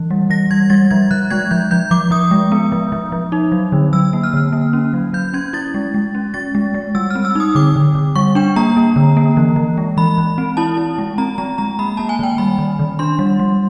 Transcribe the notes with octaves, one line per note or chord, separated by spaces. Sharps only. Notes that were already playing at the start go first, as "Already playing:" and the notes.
Already playing: E3
G3
E3 A#6
G3 G#6
G3 A6
F3 G#6
F3 F#6
G#3 G#6
F3 G6
F3 G6
F3 D6
F3 D#6
G#3
B3
F3
F3
F3
D#4
F#3
D3
F#3 E6
A#3
F6
D3
A#3
C#4
F#3
F#3 G6
C#4 G#6
E4 A6
G#3
G#3
C#4
G#3 A6
G#3
G#3
G3 E6
C4 F6
E6
D#4 D#6
D3 D6
D3
D3
G3 C#6
D4 G5
A#3 A#5
A#3
D3
A#3
E3
E3
G#3
E3 B5
E3
C4
E4 A5
E4
G#3
C4 A#5
G#3 A#5
G#3 A#5
A#3 B5
A#3 A5
G#5
D#3 G5
G3 B5
D#3
D#3
D4 C6
G3
G3